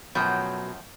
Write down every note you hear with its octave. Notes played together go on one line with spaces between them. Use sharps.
F#2 B2 F3 F#3 A3 G5